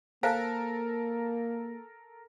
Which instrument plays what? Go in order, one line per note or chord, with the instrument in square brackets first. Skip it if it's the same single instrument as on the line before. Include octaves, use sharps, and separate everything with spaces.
[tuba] A#3 [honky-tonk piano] A4 A#4 [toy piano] C5 F5 G#5